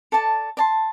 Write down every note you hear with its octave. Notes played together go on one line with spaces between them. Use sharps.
A4 D5 A5
D5 A5 C6